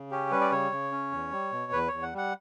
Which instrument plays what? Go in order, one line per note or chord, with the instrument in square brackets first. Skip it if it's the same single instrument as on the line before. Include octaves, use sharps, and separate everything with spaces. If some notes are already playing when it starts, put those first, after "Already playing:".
Already playing: [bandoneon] C#3
C#4 G4
G3 B4
D5
C#3 C#5
C#3
C#4
E2
G3
B2
E2 B4
E2 C#5
F#5
G3 F#5